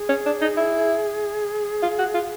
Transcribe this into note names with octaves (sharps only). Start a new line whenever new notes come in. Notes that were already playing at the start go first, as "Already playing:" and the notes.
Already playing: G#4
C#4
D4
D#4
E4
F4
F#4
F4